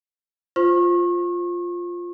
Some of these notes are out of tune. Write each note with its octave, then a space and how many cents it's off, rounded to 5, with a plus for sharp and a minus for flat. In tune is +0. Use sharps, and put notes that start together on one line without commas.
F4 +0 C5 +0 C#6 -35